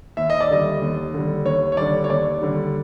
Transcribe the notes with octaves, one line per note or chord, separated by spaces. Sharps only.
D#2 E5
D#5
D5
D3 G3 D#5
D#2
D3 G3
D#2 C#5
C#5
D3 G3 D5
C#5
D#2 D5
D3 G3